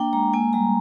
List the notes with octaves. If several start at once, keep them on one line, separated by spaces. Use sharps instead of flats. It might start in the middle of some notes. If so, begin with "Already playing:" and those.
Already playing: A#3 D4 G5
G#3 A#5
A#3 G#5
G3 A#5